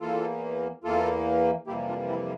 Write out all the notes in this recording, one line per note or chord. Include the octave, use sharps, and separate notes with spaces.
E2 E3 A#3 F4 A4
E2 E3 A#3 F4 A4
F2 C3 E3 G3 A#3 E4 G4
D4 F4
C4 E4